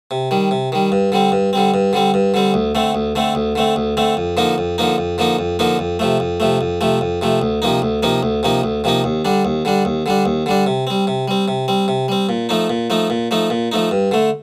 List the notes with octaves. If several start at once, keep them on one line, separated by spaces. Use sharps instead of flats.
C3
D#3 G3
C3
D#3 G3
G2
D3 G3 C4
G2
D3 G3 C4
G2
D3 G3 C4
G2
D3 G3 C4
D2
D3 A3 C4
D2
D3 A3 C4
D2
D3 A3 C4
D2
D3 A3 C4
F2
D3 F3 A#3 D#4
F2
D3 F3 A#3 D#4
F2
D3 F3 A#3 D#4
F2
D3 F3 A#3 D#4
F2
C3 F3 A3
F2
C3 F3 A3
F2
C3 F3 A3
F2
C3 F3 A3
D2
C3 F3 A#3 D#4
D2
C3 F3 A#3 D#4
D2
C3 F3 A#3 D#4
D2
C3 F3 A#3 D#4
D#2
D3 G3 D4
D#2
D3 G3 D4
D#2
D3 G3 D4
D#2
D3 G3 D4
C3
G3 C4
C3
G3 C4
C3
G3 C4
C3
G3 C4
A#2
F3 A3 D#4
A#2
F3 A3 D#4
A#2
F3 A3 D#4
A#2
F3 A3 D#4
G2
D3 A3